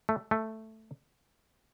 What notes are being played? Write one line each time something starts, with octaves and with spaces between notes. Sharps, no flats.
A3
A3